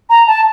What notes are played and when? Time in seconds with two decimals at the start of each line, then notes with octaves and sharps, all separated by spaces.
0.10 A#5
0.27 A5